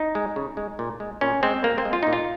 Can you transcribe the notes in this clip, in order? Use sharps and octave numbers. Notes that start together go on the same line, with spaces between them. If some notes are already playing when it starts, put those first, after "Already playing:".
Already playing: D#4
G#3
C#3
G#3
A#2
G#3
A#2 C#4
G#3 C4
A#2 A#3
C4
G#3
F4
A#2 D#4
F4